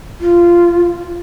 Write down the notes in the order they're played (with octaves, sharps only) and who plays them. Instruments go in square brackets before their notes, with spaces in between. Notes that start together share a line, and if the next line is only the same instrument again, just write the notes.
[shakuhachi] F4